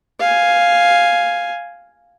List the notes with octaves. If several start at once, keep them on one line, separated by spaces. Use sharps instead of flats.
F5 G#5